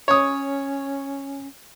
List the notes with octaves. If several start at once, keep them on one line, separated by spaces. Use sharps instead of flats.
C#4 C#5 D#6